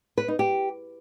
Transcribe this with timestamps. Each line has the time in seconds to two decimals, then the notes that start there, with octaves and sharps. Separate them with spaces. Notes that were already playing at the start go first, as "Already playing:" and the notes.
0.18 B4
0.28 D#4
0.39 G4